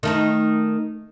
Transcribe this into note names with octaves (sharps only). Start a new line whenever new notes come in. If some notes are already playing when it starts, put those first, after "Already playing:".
D#3 A3 D#4